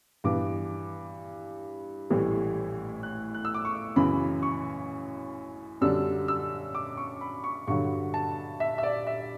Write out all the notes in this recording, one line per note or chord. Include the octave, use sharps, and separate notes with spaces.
G2 E3 B3 D6
A1 A2 E3 G3
F#6
F#6
E6
D6
C#6
F#2 C#3 E3 B5
C#6
F#2 D3 G3 D4 E6
E6
D6
C#6
B5
C#6
G2 D3 F#3 C#6
A5
E5
E5
D5
E5